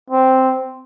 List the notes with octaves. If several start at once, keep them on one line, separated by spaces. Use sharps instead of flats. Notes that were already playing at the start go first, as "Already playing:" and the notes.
C4